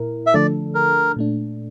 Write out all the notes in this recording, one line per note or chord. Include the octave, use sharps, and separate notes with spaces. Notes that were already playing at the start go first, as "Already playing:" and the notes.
Already playing: A#2 E4 A#4
E5
D3 F3 A3 D4 A4 D5
A#4
A#2 A3 D4